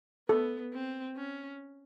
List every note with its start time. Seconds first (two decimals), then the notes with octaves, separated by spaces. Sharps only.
0.29 B3 A4
0.73 C4
1.17 C#4